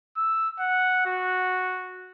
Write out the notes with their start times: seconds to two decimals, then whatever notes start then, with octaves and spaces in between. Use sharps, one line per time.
0.17 E6
0.59 F#5
1.06 F#4